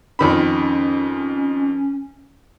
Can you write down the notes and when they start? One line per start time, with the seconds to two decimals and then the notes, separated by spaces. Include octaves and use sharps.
0.19 F2 D#3 C#4 B5